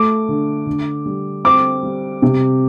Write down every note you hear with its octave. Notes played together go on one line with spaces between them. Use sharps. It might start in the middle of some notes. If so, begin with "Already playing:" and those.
Already playing: A3 D6
D3
D3
G3
C4 D6
G3
C3